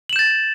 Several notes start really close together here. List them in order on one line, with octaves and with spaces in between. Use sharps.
F#7 E7 G6 A6